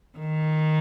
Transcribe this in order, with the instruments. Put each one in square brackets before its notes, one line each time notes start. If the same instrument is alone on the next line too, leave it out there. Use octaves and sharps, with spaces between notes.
[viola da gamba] D#3